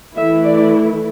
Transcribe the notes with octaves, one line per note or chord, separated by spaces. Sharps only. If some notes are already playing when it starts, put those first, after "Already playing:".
E3 A3 E4 E5
D5